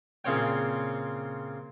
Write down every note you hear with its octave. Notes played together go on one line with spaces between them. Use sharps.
A#2 C#3 C4 C#5 G5